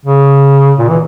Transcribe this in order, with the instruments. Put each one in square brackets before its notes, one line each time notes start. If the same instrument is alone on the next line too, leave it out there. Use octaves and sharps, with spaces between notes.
[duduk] C#3
A#2
E3